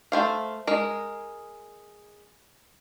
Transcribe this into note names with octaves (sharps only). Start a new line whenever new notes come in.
A3 C5 F5
G#3 A#4